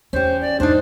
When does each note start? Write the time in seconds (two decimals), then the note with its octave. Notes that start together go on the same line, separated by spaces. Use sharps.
0.13 E2 C#4 G4 C5
0.41 D5
0.60 F2 G#2 D4 D#4 C5